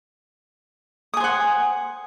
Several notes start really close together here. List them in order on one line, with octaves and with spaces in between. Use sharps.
D#6 G#5 C5 F#5